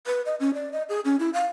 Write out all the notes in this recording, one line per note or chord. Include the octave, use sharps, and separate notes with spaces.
B4
D#5
C#4
D5
D#5
G#4
C#4
E4
F5